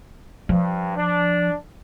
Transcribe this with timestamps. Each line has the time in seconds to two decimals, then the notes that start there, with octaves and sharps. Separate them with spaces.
0.49 G2 F3
0.97 D4